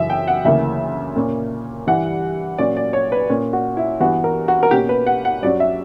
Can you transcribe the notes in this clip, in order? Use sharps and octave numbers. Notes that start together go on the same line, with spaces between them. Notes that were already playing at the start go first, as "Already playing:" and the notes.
Already playing: F#2 C#3 E3 E5
G5
F#5
D2 C#3 E3 A#3 E5
A#2 A#3 C#4
G2 E3 G3 F#5
A#2 F#3 C#4 D5
D5
C#5
B4
A#2 A#3 C#4
F#4
E4
G2 E3 B3 F#4
A#4
F#4
A#4
B2 A#3 C#4 G4
B4
F#5
F#5
G2 F#3 C#4 D5
E5